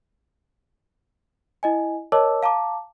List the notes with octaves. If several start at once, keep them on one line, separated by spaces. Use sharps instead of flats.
E4 D#5 G#5
A#4 C#5 D#5 A5 D6 E6
F5 A5 A#5 D6